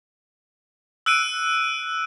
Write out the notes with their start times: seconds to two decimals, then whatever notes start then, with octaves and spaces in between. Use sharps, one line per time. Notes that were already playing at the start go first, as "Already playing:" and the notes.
1.06 E6 F#6 D7 D#7